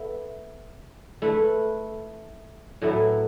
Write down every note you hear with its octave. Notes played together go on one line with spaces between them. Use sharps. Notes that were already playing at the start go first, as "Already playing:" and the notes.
Already playing: B3 A4 E5
A3 E4 B4
A2 F#3 B3 E4 A4